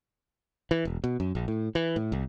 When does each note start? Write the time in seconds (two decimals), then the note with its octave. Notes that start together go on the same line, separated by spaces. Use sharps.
0.71 E3
0.85 E1
1.04 B2
1.20 F#2
1.35 A#1
1.48 A2
1.75 E3
1.96 A2
2.12 C2